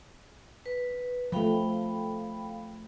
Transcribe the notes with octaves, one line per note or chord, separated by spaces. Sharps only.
B4
F3 A3 F5 G5 B5